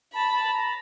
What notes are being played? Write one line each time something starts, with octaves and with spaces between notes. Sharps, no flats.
A5 B5
A5
A#5